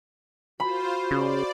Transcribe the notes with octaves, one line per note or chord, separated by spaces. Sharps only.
F4 F#4 C5 B5
C#3 D5